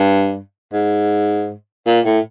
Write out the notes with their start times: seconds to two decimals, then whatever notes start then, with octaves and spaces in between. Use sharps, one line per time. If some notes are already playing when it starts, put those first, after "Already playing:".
Already playing: G2
0.73 G#2
1.86 A#2
2.06 A2